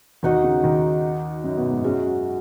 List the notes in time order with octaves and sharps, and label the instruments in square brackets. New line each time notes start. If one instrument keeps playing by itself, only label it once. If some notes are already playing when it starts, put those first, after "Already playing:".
[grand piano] D#2 D#3 [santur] D#4 F#4 D#5
[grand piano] C#3
D#2 D#3
F#2 F#3
B2 B3
G#2 G#3
[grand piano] F#2 F#3 [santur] G#3 C#4 F#4